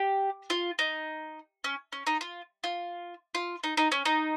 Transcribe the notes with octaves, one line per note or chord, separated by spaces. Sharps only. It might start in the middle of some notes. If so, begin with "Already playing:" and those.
Already playing: G4
F4
D#4
C#4
C#4
D#4
F4
F4
F4
D#4
D#4
C#4
D#4